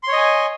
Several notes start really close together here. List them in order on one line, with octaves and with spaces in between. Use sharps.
C6 C#5 D#5 G#5